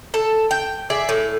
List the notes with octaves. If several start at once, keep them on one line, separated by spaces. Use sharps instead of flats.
A4
G5
G#4 D5 E5
A2